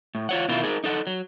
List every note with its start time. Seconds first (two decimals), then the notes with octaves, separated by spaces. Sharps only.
0.15 A2
0.29 F4 C#5 F#5
0.48 B2 D#3 E4 F4
0.63 D#4 G#4 A#4
0.84 D#4 A4 F#5
1.07 F#3